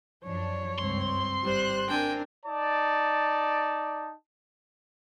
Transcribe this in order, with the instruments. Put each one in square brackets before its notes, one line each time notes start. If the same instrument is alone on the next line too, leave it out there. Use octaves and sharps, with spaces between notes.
[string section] F#2 F3 D4 [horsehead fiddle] C#5
[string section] C#2 G2 [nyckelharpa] C4 [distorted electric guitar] C6
[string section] G#1 F#6 [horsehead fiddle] G3 C5
[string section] C4 A#4 [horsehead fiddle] D4 [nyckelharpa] G5 G#5
[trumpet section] D#4 D5 A5